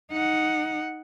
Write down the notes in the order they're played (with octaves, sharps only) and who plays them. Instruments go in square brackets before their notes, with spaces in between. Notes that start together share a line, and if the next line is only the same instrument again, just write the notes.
[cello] D#4 F#5